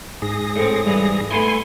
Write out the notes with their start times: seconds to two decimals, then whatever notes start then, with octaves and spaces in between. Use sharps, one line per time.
0.22 G#2 G#4 A#6
0.56 A2 C4
0.86 G2 E3
1.31 A3 B3 E4 G#5 C6